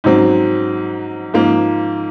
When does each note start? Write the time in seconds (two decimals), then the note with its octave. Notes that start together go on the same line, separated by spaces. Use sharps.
0.04 G#2 F#3 C4
1.34 G#2 F3 A#3